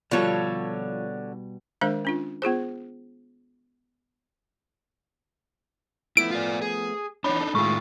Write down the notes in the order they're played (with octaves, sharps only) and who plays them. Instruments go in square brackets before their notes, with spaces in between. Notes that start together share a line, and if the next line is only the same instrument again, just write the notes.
[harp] B2 G3 B3 [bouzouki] D3 C#5 [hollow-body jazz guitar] F3 F4 A4
[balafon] D#3 G#3 D4 A#4 C5 F5
C#4 D4 F4
B3 F4 G#4 C5
[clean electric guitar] F3 A3 B3 [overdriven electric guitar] E4 [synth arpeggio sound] D7
[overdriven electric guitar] F4 D5
G#4
[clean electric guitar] E3 B3 C#5 [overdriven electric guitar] D4 D#4 [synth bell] B5
[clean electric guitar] A4
[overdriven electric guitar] A2 F4 [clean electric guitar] D#3 G#3 [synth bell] C#6